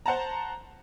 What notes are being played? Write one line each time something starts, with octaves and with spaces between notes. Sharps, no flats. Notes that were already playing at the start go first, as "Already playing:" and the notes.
C5 F#5 A5 A#5